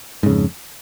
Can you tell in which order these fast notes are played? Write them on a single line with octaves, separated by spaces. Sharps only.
G#2 C#3 F2